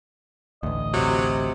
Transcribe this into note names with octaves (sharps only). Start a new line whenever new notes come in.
A1 D2 D#5
C3 F#3